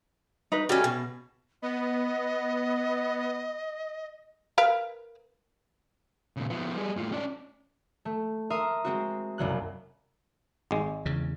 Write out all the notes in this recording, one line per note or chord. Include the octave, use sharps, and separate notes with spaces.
D#4 B4
G3 A3 C#4 F#4
B2
B3 D#5
A#4 B4 F5
A#2 C#3
F3 B3
G3 G#4
A2 F4
C#4 D5
A3
A#4 E5 A#5 C6 D#6
G#3 C4 F#4
F#1 C2 F#3 F#6
G#1 G#3
E2 C#3